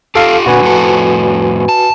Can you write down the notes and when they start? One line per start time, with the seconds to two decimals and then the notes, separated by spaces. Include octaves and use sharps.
0.15 F4 G4 A4 F5
0.46 A#2 D3 F#4 B4 G#5
0.63 F2 A2 A4
1.69 A5